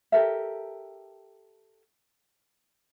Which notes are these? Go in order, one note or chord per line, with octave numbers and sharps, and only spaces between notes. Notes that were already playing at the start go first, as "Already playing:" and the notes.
G4 A4 A#4 E5